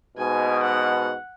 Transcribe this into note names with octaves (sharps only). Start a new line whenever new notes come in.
G#2 B2 G#5
F#5